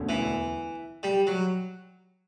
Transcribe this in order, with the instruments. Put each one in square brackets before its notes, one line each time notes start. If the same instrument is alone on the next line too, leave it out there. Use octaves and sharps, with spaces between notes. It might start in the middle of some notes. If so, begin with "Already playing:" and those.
Already playing: [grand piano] E1 D2 D3 A3 C#4
[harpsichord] E3
G3
F#3